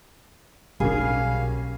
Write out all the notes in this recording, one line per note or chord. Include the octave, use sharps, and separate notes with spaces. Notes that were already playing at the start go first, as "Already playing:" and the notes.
B1 G3 A#3 C#4 G#4 F5